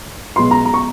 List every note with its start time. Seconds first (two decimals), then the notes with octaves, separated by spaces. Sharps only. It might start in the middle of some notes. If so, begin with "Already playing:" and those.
0.36 B1 B2 G#3 B3 C6
0.51 A#5
0.65 A#5
0.74 C#6